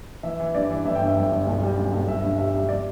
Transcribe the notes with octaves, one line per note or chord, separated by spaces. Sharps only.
E3 E5
E3
G2 D5
E3
G1 E5
G5
G2 E5
G1
G1
B1
G3
B1
B1
G1 E5
G2
G3 E5
G3
G3 D5